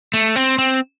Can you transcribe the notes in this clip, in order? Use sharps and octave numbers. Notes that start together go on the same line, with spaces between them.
A3
C4
C4